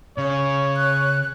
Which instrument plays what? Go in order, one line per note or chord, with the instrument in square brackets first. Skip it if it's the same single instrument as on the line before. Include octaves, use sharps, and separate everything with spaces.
[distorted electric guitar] C#3 [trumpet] C#5
[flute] F#6